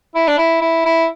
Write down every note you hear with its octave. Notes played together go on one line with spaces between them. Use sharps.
E4
D4
E4
E4
E4